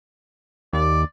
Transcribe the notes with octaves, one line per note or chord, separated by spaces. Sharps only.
D#2 D5